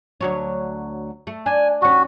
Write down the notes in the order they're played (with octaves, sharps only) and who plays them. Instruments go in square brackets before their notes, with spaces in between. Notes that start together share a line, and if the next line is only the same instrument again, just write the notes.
[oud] D2 F#3 C#5
A3
[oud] D4 [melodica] G#5
[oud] D#2 C#4 [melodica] F#4